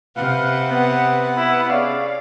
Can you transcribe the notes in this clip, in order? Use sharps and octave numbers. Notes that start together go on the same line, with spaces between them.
C3 B4 F5 F#5
B3
E4
C#4 G#4 D5 F5